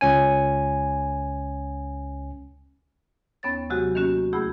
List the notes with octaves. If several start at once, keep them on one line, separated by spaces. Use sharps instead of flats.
C#2 C#4 G#5
D#2 B3 C#4 C#5 A6
C3 F#3 G#3 F#4 G4
D#3 A#3 C#4 F#4
D2 A3 E4 G#4 B5 G6